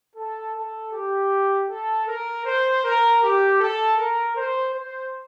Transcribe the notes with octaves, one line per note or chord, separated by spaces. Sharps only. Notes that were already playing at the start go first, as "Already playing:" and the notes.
A4
A4
G4
A4
A#4
C5
A#4
G4
A4
A#4
C5
C5